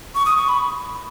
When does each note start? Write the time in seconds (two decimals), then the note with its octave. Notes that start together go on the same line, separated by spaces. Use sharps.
0.15 C#6
0.26 D#6
0.37 C#6
0.49 B5